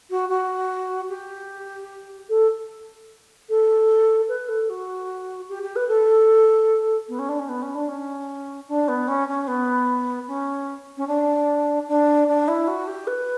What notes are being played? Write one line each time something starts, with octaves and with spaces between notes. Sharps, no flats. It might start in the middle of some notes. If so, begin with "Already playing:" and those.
F#4
F#4
G4
A4
A4
B4
A4
F#4
G4
G4
B4
A4
B3
C#4
D4
C#4
B3
C#4
D4
C#4
D4
B3
C#4
C#4
B3
C#4
C#4
D4
D4
D4
E4
F#4
G4
B4